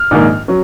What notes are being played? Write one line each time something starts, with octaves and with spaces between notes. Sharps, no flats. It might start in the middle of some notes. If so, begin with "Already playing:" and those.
Already playing: F6
A#1 G#2 D#3 A#3
F#3 C#4